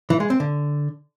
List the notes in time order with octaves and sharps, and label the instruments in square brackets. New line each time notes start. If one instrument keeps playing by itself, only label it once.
[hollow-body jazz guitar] E3
G#3
C4
D3